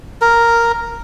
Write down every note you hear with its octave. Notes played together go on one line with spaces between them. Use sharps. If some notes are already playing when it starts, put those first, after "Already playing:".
A#4